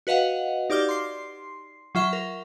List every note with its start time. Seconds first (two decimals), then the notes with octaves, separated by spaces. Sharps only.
0.07 F#4 B4 D#5 F5 F#5
0.70 D#4 G4 D5 D6 F6 G7
0.89 C6 C7
1.95 F#3 F4 E5 C#6 G7
2.13 A#4